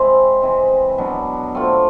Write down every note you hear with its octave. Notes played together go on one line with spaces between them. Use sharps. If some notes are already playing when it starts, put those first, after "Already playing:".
Already playing: G#3 C4 E4
C3 E3 G#3
B2 F#3 B3 D4
A3 C4 F4